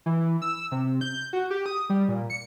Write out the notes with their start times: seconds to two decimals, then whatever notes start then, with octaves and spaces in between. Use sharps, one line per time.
0.06 E3
0.42 E6
0.72 C3
1.01 G6
1.33 F#4
1.50 G4
1.66 D#6
1.90 G3
2.08 A#2
2.30 C#7